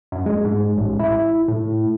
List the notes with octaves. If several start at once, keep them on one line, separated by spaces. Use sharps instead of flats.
F#2
G#3
G#2
A1
E4
A2